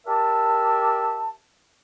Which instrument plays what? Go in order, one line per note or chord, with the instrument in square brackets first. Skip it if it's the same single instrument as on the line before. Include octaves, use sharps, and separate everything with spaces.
[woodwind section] G4 A#4 D5 E5 A5